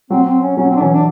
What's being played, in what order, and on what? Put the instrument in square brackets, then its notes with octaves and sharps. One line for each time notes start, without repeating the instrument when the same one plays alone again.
[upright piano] F#3 [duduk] C4
[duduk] C4
C#4
[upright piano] F#3 [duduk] C#4
[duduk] C4
D4
[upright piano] E3 [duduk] C#4
[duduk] D4